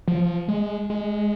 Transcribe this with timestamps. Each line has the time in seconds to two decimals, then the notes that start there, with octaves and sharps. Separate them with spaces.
0.08 F3
0.48 G#3
0.90 G#3